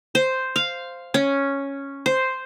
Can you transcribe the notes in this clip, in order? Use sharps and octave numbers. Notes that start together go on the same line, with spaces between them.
C5
F5
C#4
C5